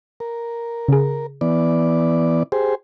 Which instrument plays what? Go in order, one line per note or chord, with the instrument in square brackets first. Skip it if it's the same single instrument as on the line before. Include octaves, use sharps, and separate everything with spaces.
[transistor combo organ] A#4
[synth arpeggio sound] C#3 G#4
[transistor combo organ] E3 B3 D5
G4 G#4 C5